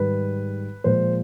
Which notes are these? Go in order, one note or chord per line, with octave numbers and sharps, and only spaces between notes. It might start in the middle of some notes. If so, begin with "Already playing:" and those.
Already playing: G#2 D#3 G3 B4
A#2 F3 G#3 C5